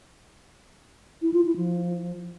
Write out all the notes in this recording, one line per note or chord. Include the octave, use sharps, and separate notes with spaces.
E4
F4
E4
F3